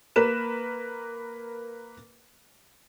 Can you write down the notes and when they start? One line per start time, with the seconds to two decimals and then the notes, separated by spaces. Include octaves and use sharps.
0.16 A#3 A#4 B4 E7